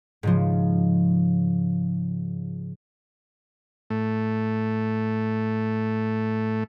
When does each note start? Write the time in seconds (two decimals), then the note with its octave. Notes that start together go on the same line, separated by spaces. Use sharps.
0.23 G#2 C#3 F3
3.90 A2 A3